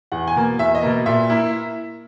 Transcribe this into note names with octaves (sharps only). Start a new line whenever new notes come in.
E2 F#5
G#5
B2 A#3
E2 E5
D#5
B2 A#3
A#2 E5
A#3 E4